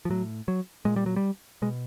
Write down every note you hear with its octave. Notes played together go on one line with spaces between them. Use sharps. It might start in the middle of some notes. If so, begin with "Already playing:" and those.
F3
A2 F#3
F#3
A#2 G#3
G3
F#3
G3
B2 G#3